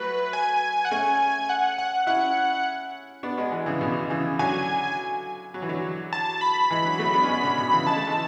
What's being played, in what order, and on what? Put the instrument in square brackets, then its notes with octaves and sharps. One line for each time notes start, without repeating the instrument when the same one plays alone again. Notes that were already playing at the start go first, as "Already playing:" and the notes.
Already playing: [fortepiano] F#3 A3 [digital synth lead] B4
[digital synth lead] G#5
F#5
[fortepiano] A3 C#4 [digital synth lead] G#5
[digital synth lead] F#5
F#5
[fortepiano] C#4 E4 [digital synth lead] F#5
[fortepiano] B3 D4
G#3 B3
E3 G#3
C#3 E3
B2 D3
C#3 E3
[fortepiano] D3 F#3 [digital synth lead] G#5
[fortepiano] F#3
E3
D3 F#3
[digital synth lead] A5
B5
[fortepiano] E3 G#3
D3 F#3
F#3 A3
B3 D4
C#4
G#3 B3
B2 D3
B2 D3
C#3 E3
[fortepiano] G#3 [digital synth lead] A5
[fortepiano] A3
E3 G#3